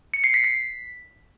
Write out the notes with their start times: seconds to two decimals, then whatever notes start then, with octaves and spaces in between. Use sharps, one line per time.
0.14 C#7
0.24 C7
0.34 B6
0.44 B6